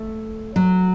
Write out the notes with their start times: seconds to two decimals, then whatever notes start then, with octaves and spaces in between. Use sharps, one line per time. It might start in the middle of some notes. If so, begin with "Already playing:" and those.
Already playing: A3
0.56 F#3